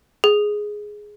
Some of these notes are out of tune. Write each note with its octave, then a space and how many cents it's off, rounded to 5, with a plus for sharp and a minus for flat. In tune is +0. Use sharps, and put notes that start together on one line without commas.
G#4 +5